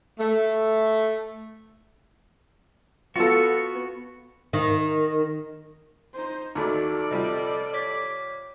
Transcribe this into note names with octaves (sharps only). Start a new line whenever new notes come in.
A3
B3 F4 F#4 A4
D#3
D#4 C5
D#2 A3 D#4 F#4 A4 D5 B5
C3 G3 F4 D#5
C#5 D6 B6